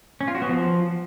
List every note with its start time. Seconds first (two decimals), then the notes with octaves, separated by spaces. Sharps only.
0.21 C#4
0.28 F4
0.35 F#4
0.42 B3
0.49 F3